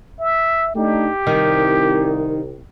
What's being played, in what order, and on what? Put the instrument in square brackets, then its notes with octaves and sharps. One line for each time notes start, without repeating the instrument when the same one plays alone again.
[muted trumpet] E5
[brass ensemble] A3 D4 D#4 [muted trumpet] G4
[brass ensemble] C2 [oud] D#3